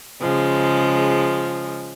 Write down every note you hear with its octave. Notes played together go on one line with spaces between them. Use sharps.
C#3 F3 G#3